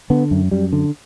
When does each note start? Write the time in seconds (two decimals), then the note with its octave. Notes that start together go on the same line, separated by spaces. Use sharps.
0.10 D3 B3
0.31 F#2
0.51 F#2 G3
0.73 D3